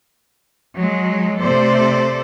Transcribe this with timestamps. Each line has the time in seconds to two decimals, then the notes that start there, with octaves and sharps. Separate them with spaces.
0.78 F#3 G#3
1.40 C3 A3 A4 C5 D5